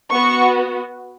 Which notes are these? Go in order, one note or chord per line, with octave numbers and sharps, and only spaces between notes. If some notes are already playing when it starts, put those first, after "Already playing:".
B3 F#4 C#6